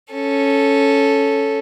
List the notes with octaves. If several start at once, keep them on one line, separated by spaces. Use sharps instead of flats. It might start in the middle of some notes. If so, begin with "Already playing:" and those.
C#4 A4